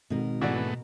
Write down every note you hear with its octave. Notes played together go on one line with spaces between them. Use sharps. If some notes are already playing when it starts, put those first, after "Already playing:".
G#1 B2 A#4
G#2 E3 A3 B3 F#4 D5